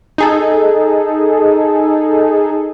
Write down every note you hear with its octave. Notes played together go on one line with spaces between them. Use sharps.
D#4 G#4 A4